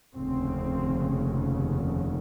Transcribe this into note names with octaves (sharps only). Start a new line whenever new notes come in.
F1 D#2 C#3 C4